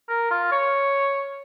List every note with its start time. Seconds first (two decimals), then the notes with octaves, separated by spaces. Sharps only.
0.09 A#4
0.31 F4
0.52 C#5